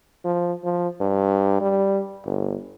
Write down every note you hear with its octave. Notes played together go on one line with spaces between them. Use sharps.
F3
F3
G2
G3
G1